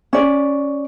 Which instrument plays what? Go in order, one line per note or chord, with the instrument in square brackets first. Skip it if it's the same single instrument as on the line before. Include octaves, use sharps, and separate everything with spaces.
[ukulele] C#4 D5